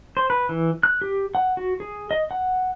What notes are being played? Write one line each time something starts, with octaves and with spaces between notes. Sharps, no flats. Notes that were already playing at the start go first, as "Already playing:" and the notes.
C5
B4
E3
F#6
G4
F#5
F#4
G#4
D#5
F#5